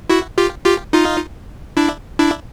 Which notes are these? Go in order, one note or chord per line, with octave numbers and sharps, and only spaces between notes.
E4 F#4
F4 G4
F4 G4
D#4 F4
D4 E4
D4 E4